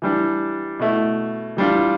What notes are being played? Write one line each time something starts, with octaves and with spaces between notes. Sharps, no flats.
E3 G3 D4
B2 A3 E4
E3 G3 D4 F4